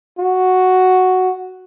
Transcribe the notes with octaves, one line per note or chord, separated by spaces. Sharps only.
F#4